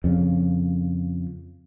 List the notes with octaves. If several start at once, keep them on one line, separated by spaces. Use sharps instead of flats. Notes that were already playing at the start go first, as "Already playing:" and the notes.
F2 C#3